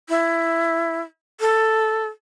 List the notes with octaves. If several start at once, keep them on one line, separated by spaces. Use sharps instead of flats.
E4
A4